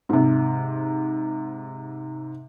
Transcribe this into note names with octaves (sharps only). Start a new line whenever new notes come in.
G#2 C3